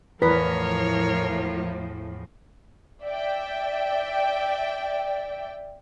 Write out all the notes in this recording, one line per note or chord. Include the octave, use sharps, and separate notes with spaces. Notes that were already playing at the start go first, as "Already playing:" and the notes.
E2 A2 F3 A#4 B4 C#5 A#5 B6
D5 E5 G5